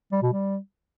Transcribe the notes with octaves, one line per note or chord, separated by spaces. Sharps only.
G3
B2
G3